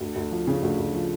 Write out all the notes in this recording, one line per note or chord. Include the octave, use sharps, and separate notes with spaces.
D2
D2
F3
C#3
D2
D2
F3